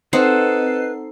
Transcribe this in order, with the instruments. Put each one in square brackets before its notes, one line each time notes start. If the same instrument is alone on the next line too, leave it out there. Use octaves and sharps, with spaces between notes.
[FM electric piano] C4 D#5 C7 [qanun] D#4 C5 F#5 [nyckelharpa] A4 [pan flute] B4